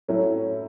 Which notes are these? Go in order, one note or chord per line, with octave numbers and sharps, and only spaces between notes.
A2 F#3 A3 C#4 E4